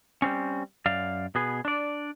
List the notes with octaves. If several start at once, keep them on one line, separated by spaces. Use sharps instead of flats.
G3 C4 C#4
F#2 D5 F5
B2 B3 G#4
D4 D5